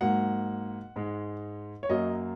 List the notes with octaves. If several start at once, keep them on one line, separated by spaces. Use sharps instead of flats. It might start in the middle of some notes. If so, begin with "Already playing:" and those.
G#2 F#3 A#3 F#5
G#2 G#3
C#5
F#2 F#3 A#3 D#5